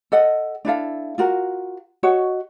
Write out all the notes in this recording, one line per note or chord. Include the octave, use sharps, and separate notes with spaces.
A4 D#5 F#5
D4 E4 A4 F5
F4 F#4 A#4
F#4 C#5 D#5